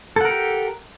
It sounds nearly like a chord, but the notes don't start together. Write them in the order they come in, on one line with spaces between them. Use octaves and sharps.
A4 F#5 A#4 G4